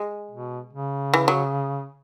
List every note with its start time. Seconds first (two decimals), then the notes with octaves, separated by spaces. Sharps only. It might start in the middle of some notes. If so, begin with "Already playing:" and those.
Already playing: G#3
0.31 B2
0.73 C#3
1.14 E3
1.28 F#3